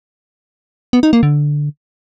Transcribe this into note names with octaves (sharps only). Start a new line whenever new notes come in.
B3
D#4
A#3
D3